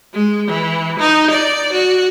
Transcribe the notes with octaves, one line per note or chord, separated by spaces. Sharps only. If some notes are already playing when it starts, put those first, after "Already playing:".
G#3
E3
D#4
D5
F#4